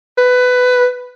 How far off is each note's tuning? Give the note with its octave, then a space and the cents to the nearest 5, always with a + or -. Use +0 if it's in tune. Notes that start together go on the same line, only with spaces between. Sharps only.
B4 +15